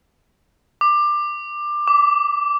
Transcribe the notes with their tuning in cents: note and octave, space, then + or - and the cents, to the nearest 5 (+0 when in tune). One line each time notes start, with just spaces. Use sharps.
D6 +20
D6 -15